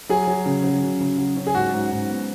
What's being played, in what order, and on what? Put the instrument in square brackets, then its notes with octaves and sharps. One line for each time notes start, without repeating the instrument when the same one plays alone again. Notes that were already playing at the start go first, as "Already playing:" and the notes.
[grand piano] F#3 [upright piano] G#4
[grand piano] F#3
C#3
F#3
C#3
C#3
F#3
C#4
[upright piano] G#4
[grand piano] G#2 [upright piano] F#4
[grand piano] G#2
G#2
B3